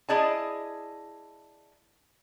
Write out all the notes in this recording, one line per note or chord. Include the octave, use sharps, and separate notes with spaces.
E4 G#4 D5 D#5 G#5 A5